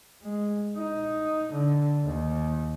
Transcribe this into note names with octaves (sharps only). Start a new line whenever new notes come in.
G#3
D#4
D3
D#2